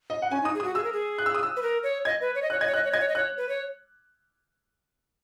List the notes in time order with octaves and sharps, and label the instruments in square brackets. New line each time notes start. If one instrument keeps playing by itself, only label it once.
[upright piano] D#5
F#5
[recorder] C#4 [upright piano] G#5
[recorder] D#4
[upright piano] D#6
[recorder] G#4
[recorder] F#4 [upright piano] D#6
[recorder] G#4 [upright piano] E6
[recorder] A#4
G#4
[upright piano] F#6
E6
D#6
E6
[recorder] B4
A#4
C#5
[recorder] D#5 [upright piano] G#6
[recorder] B4
C#5
D#5
[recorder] C#5 [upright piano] F#6
[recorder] D#5 [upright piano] G#6
[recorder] C#5
[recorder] D#5 [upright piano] F#6
[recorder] C#5
[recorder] D#5 [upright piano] G#6
[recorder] C#5
D#5
[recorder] C#5 [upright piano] F#6
[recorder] B4
C#5